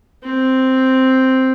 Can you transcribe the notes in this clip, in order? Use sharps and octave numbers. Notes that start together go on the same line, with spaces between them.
C4